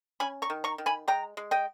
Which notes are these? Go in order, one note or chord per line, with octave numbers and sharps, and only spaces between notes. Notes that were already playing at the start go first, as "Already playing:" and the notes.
C#4 G#5 B5
A#5 C#6
D#3
A#5 C#6
D#3
G#5 B5
G#3 G5 A#5
G#3
D#5 G5